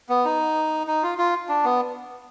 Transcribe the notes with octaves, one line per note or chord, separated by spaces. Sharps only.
B3
D#4
D#4
F4
F4
D4
B3